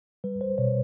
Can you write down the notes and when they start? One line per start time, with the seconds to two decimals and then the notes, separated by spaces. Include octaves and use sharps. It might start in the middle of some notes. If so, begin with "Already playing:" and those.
0.24 G3 B4
0.41 C5
0.58 B2 C#5